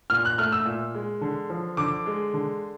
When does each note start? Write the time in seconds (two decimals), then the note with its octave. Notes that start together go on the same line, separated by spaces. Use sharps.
0.10 A#2 F6
0.25 F#6
0.38 A3 F6
0.52 E6
0.65 A#2
0.94 G#3
1.21 D3
1.50 F3
1.77 D3 D6
2.06 G#3
2.34 D3